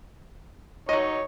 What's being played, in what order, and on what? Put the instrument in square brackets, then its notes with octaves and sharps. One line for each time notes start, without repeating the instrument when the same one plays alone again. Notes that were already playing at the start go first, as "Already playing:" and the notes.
[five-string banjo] F#3 D#5 [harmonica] D#4 C#5